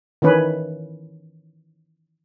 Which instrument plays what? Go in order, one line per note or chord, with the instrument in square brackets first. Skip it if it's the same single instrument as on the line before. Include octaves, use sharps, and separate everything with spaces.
[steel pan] D#3 E3 C#4 B4